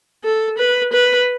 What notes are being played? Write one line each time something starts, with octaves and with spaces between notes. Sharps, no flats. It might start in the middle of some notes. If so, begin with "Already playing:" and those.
A4
B4
B4